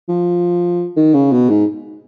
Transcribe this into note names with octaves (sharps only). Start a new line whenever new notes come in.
F3
D#3
C#3
B2
G#2